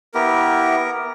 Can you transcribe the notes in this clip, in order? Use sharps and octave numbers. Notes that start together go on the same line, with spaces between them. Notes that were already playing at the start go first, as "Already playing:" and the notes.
B3 E4 G4 A#4